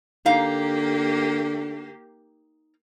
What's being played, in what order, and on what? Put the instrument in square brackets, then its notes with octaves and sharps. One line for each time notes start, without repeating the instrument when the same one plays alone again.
[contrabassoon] D3 [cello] A#3 G4 [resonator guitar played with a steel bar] D#4 F5 A#5